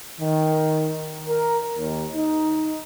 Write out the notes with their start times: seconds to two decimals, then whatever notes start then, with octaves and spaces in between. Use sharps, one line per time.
0.20 D#3
1.27 A#4
1.77 D#2
2.12 D#4